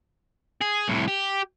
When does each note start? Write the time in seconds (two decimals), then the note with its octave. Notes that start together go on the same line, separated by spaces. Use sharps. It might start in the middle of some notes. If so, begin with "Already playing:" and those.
0.61 G#4
0.88 C2 A2
1.08 G4